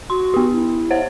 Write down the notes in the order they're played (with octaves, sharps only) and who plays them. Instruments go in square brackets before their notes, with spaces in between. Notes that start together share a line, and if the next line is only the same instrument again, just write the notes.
[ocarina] F#4 [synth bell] C6
[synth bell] B3 G4
[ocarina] E4
[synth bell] C5 C#5 F#5